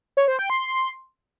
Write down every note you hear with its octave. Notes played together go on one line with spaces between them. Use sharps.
C#5
C5
G5
C6